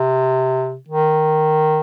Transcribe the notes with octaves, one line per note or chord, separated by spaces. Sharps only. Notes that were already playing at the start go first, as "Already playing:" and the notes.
Already playing: C3
D#3